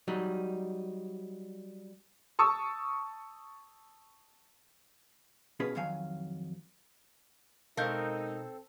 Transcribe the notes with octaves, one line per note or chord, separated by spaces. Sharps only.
F#3 G3 D#4
A5 C#6 D#6 E6
B2 C#4 F4 G#4 B4
F2 D#3 F#3 F5 G#5
B2 G#3 C4 D#4 A4 A#4 F5 G6